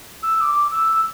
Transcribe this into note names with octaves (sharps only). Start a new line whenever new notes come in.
E6
E6
D6
E6